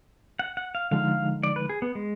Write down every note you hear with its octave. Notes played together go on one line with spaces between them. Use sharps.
F#5
F#5
F5
D3 F3 G#3 D#4 F5
D5
B4
G#4
B3
G#3